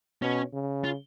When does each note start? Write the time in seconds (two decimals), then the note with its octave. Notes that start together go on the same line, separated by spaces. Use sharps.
0.22 B2 C#4
0.53 C#3
0.84 F4